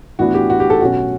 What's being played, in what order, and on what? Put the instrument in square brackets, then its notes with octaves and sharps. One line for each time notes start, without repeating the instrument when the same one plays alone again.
[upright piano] A2 E3 B3 D4 F#4
G4
F#4
G4
A4
B2 F#3 C#4 F#4